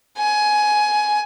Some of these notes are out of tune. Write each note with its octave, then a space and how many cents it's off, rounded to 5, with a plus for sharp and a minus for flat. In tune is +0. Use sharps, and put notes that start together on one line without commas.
G#5 +15